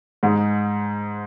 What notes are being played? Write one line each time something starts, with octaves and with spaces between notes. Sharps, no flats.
G#2 G#3